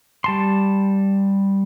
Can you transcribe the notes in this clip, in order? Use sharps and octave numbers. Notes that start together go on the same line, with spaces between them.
G3 A5 C6